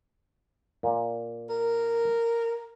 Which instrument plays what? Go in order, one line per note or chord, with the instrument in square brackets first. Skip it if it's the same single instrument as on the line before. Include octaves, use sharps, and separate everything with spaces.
[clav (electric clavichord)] A#2
[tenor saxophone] A#4